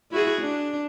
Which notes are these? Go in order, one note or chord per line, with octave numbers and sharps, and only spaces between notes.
E4 F#4 G#4
D4